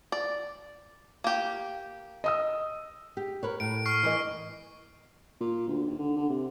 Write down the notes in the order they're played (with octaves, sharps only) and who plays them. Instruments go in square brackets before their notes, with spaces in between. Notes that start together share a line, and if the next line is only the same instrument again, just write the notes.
[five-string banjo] D5
A#3 G4
[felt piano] D#5 D#6 E6
[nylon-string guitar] G4
A#4 B4 C#5
[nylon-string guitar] A2 [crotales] D7
[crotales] C#6 F6 C7
[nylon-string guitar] E3 A#3 D#5
[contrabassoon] A#2
D2
D#2
D3
D3
C3